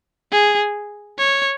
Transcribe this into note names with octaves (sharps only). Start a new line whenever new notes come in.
G#4
C#5